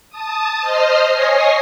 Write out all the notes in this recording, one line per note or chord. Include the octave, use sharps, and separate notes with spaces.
A5 D#6
C5 D#5 F6 C7
C#5 D#5 G#5 A#6 C7